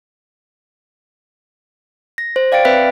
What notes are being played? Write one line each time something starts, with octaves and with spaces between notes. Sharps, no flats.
A#6
C5
D5 F5 G5 A6 D7
C4 B4 E5 B5 F#6 B6